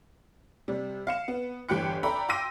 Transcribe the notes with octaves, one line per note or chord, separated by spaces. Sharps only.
C3 G3
F5 C#7 E7
B3
G1 E2 G4 G5 F#6 C#7
A4 D5 E5 G5 A#5 B5
G5 C6 D6 E6 A#6 D#7